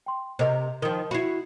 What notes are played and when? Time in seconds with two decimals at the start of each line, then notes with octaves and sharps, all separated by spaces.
0.06 G5 C6
0.39 C3 A#4 C5 D#5
0.82 D#3 F3 A#4 D#6 G7
1.11 E4 F#4 B5 C7